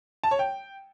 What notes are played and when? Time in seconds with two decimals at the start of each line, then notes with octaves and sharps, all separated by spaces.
0.24 A5
0.31 C#5
0.39 G5